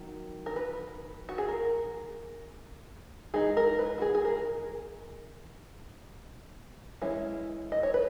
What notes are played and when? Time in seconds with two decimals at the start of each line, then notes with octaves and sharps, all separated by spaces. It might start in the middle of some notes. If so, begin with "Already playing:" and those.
Already playing: D#3 F#3
0.46 A#4
0.56 B4
1.29 F#4
1.38 G#4
1.48 A#4
3.34 E3 G#3 D#4 G#4
3.57 A#4
3.79 B4
3.98 F#4
4.02 G#4
4.15 G#4
4.25 A#4
7.02 E3 G#3 C#4 E4
7.72 D#5
7.83 C#5
7.94 B4